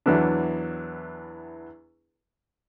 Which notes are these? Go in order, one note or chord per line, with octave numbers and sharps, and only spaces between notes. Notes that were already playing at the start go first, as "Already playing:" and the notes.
E2 E3 F#3 B3 D4